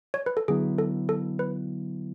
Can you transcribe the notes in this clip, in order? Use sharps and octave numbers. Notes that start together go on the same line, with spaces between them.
C#5
B4
A4
D3 F#3 B3 E4 G#4
A4
A4
B4